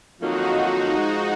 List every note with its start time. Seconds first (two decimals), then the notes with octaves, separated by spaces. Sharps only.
0.21 F2 D#3 F#3 A#3 D#4 F4 F#4
0.97 G#2 F3 G#3